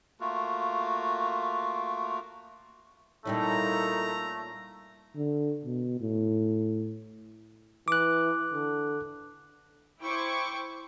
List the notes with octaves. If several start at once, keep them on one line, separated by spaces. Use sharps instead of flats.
A3 A#3 F4 F#4
A#2 G3 A3 C#4 D#4 E4 A4 A#5
D3
B2
A2
E3 D6 F#6
D3
E4 C5 G5 C#6 D6